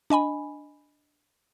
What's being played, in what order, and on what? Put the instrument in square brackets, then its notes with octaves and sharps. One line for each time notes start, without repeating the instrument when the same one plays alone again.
[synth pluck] D4 D#5 G#5 B5